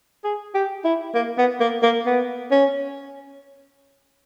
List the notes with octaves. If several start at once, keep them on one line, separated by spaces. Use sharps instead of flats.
G#4
G4
E4
A#3
B3
A#3
A#3
B3
C#4